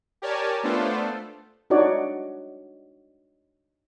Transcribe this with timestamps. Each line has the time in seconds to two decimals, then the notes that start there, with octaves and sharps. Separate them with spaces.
0.22 G4 A#4 C#5 D5 G#5 A5
0.63 A3 B3 D4 F4 A4 C5
1.70 D4 D#4 F#4 C#5 D5